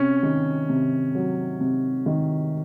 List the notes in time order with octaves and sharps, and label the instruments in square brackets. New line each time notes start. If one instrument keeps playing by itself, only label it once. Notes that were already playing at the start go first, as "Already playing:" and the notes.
Already playing: [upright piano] C3 [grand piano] C#4
[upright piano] D#3
C3
F#3
C3
D#3